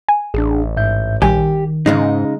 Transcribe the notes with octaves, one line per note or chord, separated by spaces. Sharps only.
G#5
A1 D4 G#4
G#2 E5 G6
A#1 D#3 G3 G4 G#5
G#2 C#3 G#3 D#4